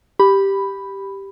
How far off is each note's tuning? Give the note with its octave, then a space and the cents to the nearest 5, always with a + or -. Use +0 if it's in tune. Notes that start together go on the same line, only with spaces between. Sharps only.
G4 +0 B5 +5